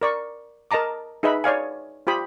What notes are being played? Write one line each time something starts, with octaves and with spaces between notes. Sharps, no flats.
A#4 D5 C#6
A#4 D#5 A5 A#5 D6
D#4 G#4 B4 D#5 E5 B5
C#5 D5 F5 G#5
F4 G4 C5 B5 D#6